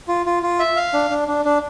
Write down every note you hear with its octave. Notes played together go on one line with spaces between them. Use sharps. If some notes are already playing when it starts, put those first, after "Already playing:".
F4
F4
F4
E5
F5
D4
D4
D4
D4